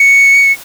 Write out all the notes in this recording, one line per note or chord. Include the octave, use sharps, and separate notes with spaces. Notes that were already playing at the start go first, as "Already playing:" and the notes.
Already playing: C#7